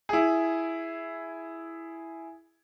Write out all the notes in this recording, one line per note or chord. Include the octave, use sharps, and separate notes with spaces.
E4 G#4